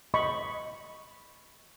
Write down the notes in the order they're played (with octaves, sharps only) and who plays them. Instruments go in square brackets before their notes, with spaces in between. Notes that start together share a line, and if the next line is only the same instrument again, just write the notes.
[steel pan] D#5 B5 C#6